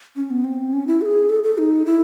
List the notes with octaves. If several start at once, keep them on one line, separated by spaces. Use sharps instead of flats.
C#4
B3
C4
C#4
E4
A4
G#4
A4
A4
D#4
E4